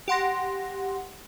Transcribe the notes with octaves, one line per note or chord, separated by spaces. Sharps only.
G4 F#5 C6 A#6